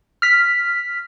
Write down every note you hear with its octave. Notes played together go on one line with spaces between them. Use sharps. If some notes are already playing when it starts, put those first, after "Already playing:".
F6 B6